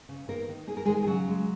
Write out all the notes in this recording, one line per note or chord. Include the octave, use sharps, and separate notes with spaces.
C#3
D#3 A#3 A#4
D#3
A#3 G#4
A#4
D#3 G#3 G#4
G#4
C#3 F#3 F#4
G#3